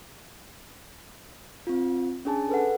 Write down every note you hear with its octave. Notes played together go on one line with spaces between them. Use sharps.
C4 F4
C#4 D4 G#4 G#5 A5
A4 B4 F#5